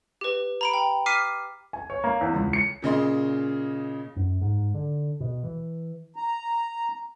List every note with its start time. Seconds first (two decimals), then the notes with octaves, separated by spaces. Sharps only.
0.21 G4 B4
0.61 A#5 B5 D7
0.73 G5
1.06 D6 F6 B6 C7 D#7
1.73 G#5
1.90 C#5
2.04 A#3
2.21 E2
2.34 C#2
2.53 C#7
2.82 A#2 C#3 D#5 C6
4.16 F#2
4.41 G#2
4.74 D3
5.20 B2
5.44 E3
6.16 A#5